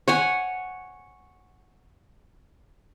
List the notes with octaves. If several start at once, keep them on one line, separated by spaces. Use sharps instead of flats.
C#5 F#5 G#5